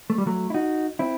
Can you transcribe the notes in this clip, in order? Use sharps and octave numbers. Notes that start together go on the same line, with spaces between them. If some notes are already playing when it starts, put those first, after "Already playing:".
A3
G3
F#3 A3
E4
D#4 F#4
C4 E4